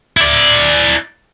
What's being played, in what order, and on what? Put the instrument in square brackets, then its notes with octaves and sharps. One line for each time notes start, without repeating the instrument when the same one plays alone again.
[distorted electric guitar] E4 D5